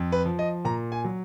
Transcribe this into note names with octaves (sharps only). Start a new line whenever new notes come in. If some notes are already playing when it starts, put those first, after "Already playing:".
Already playing: F2
B4
F3
D#5
A#2 A#5
G#5
F#3